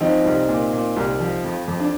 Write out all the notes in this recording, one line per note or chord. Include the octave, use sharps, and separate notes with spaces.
F3 C4 D#4
C2
A#2
A#2
C2
F3
F2
F2
D4